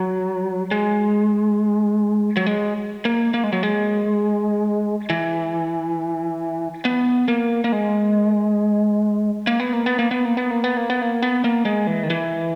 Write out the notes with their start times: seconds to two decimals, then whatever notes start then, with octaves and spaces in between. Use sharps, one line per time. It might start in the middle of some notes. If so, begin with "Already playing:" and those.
Already playing: F#3
0.71 G#3
2.37 F#3
2.46 G#3
3.05 A#3
3.34 A#3
3.44 G#3
3.53 F#3
3.63 G#3
5.10 E3
6.85 B3
7.28 A#3
7.64 A#3
7.72 G#3
9.47 A#3
9.60 B3
9.73 A#3
9.86 B3
9.99 A#3
10.11 B3
10.25 A#3
10.37 B3
10.51 A#3
10.64 B3
10.77 A#3
10.90 B3
11.02 A#3
11.22 B3
11.44 A#3
11.65 G#3
11.87 E3
12.03 D#3
12.10 E3